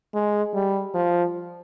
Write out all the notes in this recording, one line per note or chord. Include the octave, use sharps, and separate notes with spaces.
G#3
G3
F3